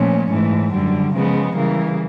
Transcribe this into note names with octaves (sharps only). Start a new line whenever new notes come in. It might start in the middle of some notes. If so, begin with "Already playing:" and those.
Already playing: A#2 F3 A3 C#4
G#2 E3 A3
F#2 D3 G3
C#3 F3 G#3 B3
C#3 E3 G3 A#3